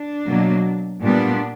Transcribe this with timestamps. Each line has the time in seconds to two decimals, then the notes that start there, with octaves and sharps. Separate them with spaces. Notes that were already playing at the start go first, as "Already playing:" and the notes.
Already playing: D4
0.25 B2 F#3 A#3
1.02 A#2 G3 B3 D4